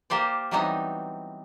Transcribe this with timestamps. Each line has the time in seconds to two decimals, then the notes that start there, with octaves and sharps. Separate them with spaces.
0.10 A#3 G4 C5 D5
0.51 E3 F#3 G3 B3 C4 D#4